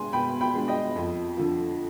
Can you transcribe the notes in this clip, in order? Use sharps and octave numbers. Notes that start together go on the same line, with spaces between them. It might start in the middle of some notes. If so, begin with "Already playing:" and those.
Already playing: B2 G#3 D4 G#5 C6
B2 G5 B5
G5 B5
G#3 D4
D#5 G5
F2
D3 F3